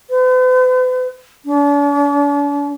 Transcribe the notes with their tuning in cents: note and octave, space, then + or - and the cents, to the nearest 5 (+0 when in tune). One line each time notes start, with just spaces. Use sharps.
B4 +45
D4 -45